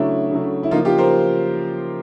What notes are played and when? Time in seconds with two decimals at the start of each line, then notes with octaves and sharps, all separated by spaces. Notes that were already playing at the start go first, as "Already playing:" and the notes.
Already playing: C#3 F#3 A3 D4 E4
0.31 C#3 F#3 A3
0.63 E4
0.71 C#3 F3 A#3 D#4 F4
0.85 F4 G4
0.98 A#4 C5